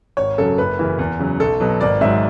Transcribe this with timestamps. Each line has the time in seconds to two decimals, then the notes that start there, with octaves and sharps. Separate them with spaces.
0.17 G#1 C#5
0.38 F#2 C#3 F#3 A4
0.58 F#1 B4
0.79 F#2 C#3 E3
0.99 E2
1.19 C#3 F#3
1.40 B1 A4
1.60 B2 F#3
1.81 G#1 D5
2.01 G#2 F#3 E5